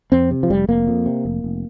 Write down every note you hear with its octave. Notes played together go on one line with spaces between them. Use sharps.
F2 C4
C3
F3
F1 G3
F1 A#3
F2
C3
F1
F1